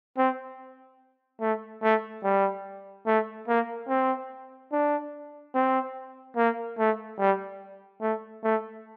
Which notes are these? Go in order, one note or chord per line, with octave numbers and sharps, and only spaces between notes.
C4
A3
A3
G3
A3
A#3
C4
D4
C4
A#3
A3
G3
A3
A3